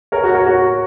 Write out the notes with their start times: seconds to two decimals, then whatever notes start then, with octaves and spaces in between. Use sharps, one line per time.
0.12 A#4 C#5
0.24 F#4 A#4
0.34 A#4 C#5
0.45 F#4 A#4